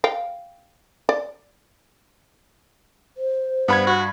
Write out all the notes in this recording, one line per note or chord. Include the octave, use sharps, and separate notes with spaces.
F5 G5
D5
C5
G2 B3 B5 G#6
F#4